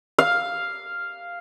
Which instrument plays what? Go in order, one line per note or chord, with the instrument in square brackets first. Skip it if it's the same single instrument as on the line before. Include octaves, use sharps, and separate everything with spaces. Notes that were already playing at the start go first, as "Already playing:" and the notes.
[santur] F5